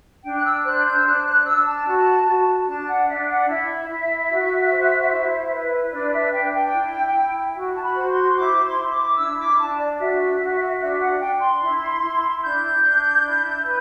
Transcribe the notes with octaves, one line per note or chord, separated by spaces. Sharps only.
D4 G5
F#6
E6
C5 F#6
G6
E6
D4 F#6
F#6
D4 E6
A5
F#4
F#4
D4 A5
F#5
D4 E5
F#5
E4 E5
E4
F#4
C5
E4
B4
D4 D5
E5
D4 G5
G5
E4
E4
F#4
A5
B5
C5
C6
E4 D6
C6
E4
D6
D4 E6
D6
D4 A5
D5
F#4 E5
F#4
D4 E5
F#5
D4 G5
C6
E4
E4
D4 G6
D4
E4
B4